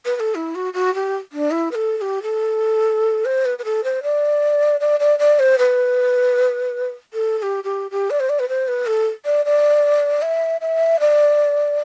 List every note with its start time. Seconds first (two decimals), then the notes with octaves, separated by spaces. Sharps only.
0.05 B4
0.15 B4
0.20 A4
0.35 E4
0.55 F#4
0.73 F#4
0.94 G4
1.32 D4
1.51 E4
1.71 B4
1.75 A4
1.97 A4
2.01 G4
2.22 A4
3.25 C5
3.45 B4
3.58 B4
3.64 A4
3.84 C5
4.03 D5
4.80 D5
5.00 D5
5.19 D5
5.39 C5
5.58 B4
7.13 A4
7.38 A4
7.42 G4
7.64 G4
7.91 G4
8.10 D5
8.20 C5
8.29 D5
8.39 B4
8.49 C5
8.68 B4
8.86 A4
9.25 D5
9.45 D5
10.22 E5
10.61 E5
11.00 D5